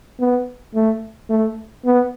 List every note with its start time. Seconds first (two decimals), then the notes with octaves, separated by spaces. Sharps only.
0.20 B3
0.74 A3
1.30 A3
1.85 B3